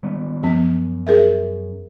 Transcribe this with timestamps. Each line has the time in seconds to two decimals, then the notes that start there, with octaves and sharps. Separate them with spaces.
0.03 D#3 G3 B3
0.43 F#2 F3 B3
1.07 G#4 A#4 E5